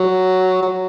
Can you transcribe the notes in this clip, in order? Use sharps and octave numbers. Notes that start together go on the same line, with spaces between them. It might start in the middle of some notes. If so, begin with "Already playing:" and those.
Already playing: F#3
F#3